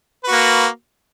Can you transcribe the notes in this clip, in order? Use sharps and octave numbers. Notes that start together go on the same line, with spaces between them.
A#3 F#4 B4